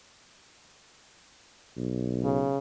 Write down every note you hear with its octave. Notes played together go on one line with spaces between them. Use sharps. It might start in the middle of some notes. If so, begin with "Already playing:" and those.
B1
C#3